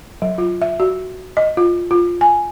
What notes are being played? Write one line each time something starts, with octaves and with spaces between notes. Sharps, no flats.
F#3
F4
E5
F#4
D#5
F4
F4
G#5